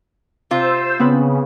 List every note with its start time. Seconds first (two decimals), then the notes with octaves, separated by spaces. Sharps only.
0.51 C3 F4 C5 E6
0.99 C#3 B3 C4 B4